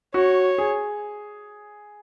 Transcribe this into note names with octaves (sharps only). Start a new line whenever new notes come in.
F#4 C#5
G#4